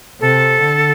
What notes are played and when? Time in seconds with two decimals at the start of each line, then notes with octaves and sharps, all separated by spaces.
0.21 C3 A4
0.61 D3